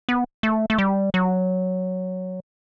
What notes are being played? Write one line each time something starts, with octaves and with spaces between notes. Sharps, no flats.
B3
A3
A3
G3
F#3